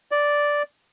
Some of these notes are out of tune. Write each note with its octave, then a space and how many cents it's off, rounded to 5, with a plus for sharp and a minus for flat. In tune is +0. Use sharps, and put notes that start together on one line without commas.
D5 -5